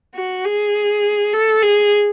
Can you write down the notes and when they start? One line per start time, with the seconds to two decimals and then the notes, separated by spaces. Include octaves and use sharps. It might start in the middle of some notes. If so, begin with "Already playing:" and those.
0.15 F#4
0.45 G#4
1.33 A4
1.62 G#4